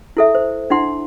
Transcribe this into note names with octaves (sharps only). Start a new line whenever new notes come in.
E4 A4 E5
C5
D4 E4 F#5 C6